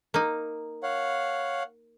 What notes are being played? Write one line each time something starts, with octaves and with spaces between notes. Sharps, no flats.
A#3 D#4
C#5 F5 F#5